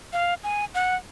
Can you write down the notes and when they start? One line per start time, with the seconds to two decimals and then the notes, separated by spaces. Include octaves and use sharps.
0.13 F5
0.44 G#5
0.74 F#5